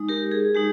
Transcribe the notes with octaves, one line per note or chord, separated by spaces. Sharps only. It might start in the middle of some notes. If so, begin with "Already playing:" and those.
Already playing: G#3 D#4
G4 A#4
G#4
G#3 D#4 G4